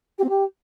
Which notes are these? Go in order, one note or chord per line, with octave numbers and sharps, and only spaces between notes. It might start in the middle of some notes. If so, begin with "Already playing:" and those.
G4
C4
G4